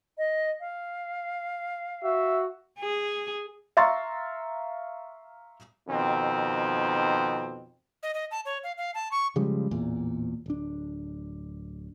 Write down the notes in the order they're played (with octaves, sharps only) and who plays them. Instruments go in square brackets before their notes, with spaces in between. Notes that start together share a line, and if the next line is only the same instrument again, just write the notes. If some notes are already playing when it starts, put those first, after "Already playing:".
[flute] D#5
F5
[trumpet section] F#4 E5
[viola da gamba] G#4
[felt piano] E5 F5 A#5 C6 C#6 A6
[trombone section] F2 B2 D#3 C4
[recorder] D#5
D#5
A5
C#5
F5
F5
A5
C#6
[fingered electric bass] C#3 F3 G3 G#3
A1 E2 A#2
D1 D4